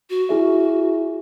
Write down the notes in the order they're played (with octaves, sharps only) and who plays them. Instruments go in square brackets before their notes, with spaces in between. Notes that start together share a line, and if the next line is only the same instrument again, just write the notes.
[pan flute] F#4
[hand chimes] E4 G#4 E5